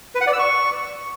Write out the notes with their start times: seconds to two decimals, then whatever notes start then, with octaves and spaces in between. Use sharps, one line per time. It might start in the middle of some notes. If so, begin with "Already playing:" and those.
0.15 B4
0.21 F#5
0.27 D5
0.33 E6
0.39 C#6